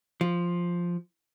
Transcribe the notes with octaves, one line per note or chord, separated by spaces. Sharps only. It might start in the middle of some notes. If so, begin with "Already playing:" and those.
F3